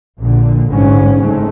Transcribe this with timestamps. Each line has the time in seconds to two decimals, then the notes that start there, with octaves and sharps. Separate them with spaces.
0.18 A#1 A#2 D3
0.69 A1 G#2 D3 F#3 C#4
1.19 F#1 G#2 G#3 A3